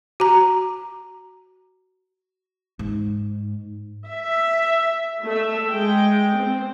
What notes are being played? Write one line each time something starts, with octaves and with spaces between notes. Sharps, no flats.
F#4 A#5
G#2
E5
A3 E5
G#3 G5
C4